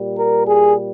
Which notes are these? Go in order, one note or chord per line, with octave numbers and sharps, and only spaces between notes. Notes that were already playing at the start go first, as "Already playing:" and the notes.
Already playing: A#2 G3
A#4
G#4